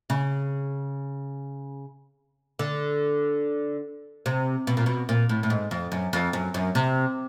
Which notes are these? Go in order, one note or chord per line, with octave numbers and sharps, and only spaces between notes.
C#3
D3
C3
B2
A#2
B2
A#2
A2
A2
G#2
F2
F#2
F2
F#2
F#2
C3